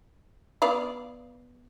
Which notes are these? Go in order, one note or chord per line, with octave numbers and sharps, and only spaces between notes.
B3 D5 F5